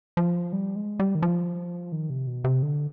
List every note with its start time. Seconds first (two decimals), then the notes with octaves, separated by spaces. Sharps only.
0.17 F3
0.53 G3
0.76 G#3
1.00 G3
1.15 D#3
1.22 F3
1.92 D#3
2.10 C3
2.27 B2
2.44 C3
2.62 D3